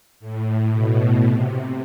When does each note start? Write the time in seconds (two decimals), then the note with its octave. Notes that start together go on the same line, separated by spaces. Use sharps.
0.20 A2
0.72 B2
1.23 C3